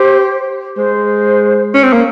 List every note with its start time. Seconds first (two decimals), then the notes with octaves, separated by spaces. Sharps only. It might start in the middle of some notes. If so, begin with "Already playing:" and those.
Already playing: G4 C5
0.77 G#3 C5
1.74 C#4
1.83 C4
1.93 A#3